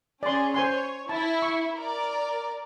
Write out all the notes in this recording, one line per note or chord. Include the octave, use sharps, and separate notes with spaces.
C#4 G#4 D5 C6
C5 C#5 G#5 C6
E4 A5
C#6
A#4 D5